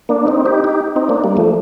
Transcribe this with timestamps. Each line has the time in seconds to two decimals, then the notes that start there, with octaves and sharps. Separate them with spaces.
0.09 A#3 D4
0.27 C4 D#4
0.45 D#4 G4
0.64 D#4 G4
0.96 C4 D#4
1.09 A#3 D4
1.24 G3 A#3
1.37 F3 A3